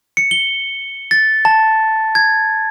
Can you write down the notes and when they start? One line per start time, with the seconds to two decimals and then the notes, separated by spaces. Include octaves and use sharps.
0.17 C#7
0.31 G7
1.11 A6
1.45 A5
2.15 G#6